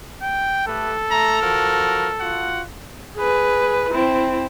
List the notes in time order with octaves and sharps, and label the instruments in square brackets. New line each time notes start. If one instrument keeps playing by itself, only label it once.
[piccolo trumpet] G5
[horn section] A3 G4 B4 [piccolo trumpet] A4
[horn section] A3 A#5
F3 F#4 A#4
F4 F#4 F#5
[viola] G#4 B4
C4 E4